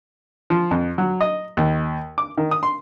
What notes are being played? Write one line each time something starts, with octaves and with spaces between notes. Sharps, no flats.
F3
F2
F#3
D#5
D#2
D6
D#3
D#6
C6